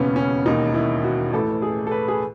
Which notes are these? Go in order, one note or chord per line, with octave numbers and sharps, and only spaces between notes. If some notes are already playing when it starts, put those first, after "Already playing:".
Already playing: E1 D#2 C#3 B3 C#4
C#4
E1 D#2 D#3 D#4
E4
F#4
A1 A2 E3 A4
G#4
A4
B4
G#4